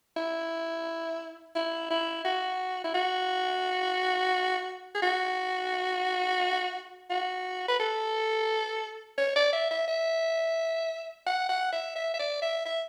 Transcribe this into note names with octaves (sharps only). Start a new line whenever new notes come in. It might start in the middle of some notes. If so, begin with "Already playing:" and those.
E4
E4
E4
F#4
E4
F#4
G#4
F#4
F#4
B4
A4
C#5
D5
E5
E5
E5
F#5
F#5
E5
E5
E5
D5
E5
E5